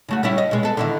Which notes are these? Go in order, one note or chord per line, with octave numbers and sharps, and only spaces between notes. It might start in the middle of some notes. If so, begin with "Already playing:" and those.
C#3 A3 F#4
G3 C#4 E4
D#5
B2 G#3
B3 A4
D3 D#3 E4